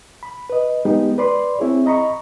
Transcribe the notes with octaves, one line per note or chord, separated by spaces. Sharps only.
B5
B4 D#5
G#3 B3 D#4 G4
B4 D5 B5 C6
C4 E4 G#4 C#5
D#5 A#5 B5 C#6